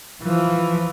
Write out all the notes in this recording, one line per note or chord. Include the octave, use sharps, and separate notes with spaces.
E3 F3